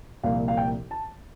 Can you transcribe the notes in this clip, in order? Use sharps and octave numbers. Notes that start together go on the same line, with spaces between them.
C2 A#2 F3 F5
F5
G5
A5